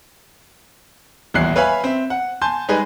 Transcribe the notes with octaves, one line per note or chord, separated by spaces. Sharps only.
D#1 A1 E2 E4 F#6 C7
B4 C#5 E5 F5 G#5 B5
C4 E5
F#5
G#5 A5 C6 G6
G3 G#3 D#4 G#4 B4